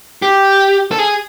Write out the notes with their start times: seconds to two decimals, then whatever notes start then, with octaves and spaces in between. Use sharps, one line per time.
0.22 G4
0.91 A4
0.99 G#4